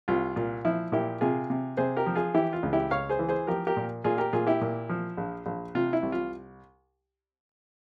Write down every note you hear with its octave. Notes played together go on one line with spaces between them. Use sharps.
C2 F4
A#2 F4
F3 E4
A#2 E4 G4
C3 F4 G#4
C3
C3 G#4 C5
G4 A#4
F3
F4 G#4
E3 E4 G4
F4
C#2
E4 G4
C#2 C#5 F5
G#4 C5
E3
G#4 C5
F3 G4 A#4
G4 A#4
A#2
A#2 F4 G#4
G4 A#4
A#2 F4 G#4
E4 G4
A#2
F3
A#1
A#1
C3 F4
E4
C2
F4